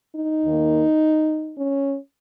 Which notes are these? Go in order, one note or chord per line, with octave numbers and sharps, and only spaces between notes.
D#4
D#2 D#3 A#3
C#4